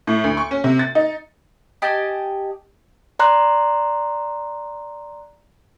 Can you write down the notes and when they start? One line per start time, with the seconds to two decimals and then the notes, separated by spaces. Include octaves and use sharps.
0.07 A2
0.24 D2
0.37 C#6
0.51 C#4
0.64 C3
0.79 A6
0.95 D#4
1.82 G4 D#5 G#5 A5
3.19 D5 A#5 C6 F#6